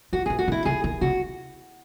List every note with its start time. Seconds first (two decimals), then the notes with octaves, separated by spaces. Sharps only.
0.13 D#3 F#4
0.26 E3 G#4
0.39 F#4
0.48 D#3
0.52 E4
0.65 C#3 G#4
0.84 D#3 G#4
1.01 C#3 F#4